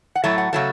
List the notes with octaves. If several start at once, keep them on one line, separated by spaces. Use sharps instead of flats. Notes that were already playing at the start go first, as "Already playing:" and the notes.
F#5
A2 F#3 A3 E5
F#5
C#3 F#3 A3 E5